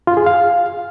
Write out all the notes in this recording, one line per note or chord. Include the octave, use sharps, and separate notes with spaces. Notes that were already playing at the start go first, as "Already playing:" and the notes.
F4
G#4
F5